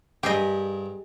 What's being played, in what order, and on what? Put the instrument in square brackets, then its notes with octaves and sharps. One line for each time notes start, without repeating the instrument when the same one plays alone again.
[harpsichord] G2 A#4 [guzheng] G4 G#4 D#5